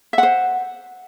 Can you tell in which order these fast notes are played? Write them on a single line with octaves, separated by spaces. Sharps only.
E5 F#5 C5